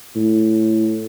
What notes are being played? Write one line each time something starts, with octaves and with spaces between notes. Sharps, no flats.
A2